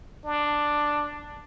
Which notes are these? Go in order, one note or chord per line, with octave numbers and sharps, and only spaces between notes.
D4